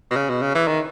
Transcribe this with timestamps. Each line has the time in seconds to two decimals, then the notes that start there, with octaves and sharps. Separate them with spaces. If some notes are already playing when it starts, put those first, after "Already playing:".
0.11 B2
0.16 C#3
0.30 B2
0.42 C#3
0.55 E3
0.68 D#3